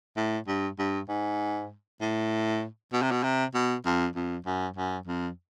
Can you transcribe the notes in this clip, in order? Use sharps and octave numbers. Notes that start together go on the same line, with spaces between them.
A2
G2
G2
G#2
A2
B2
C3
B2
C3
B2
F2
F2
F#2
F#2
F2